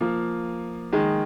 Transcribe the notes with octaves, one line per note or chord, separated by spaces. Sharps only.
F3 A#3
D#3 G#3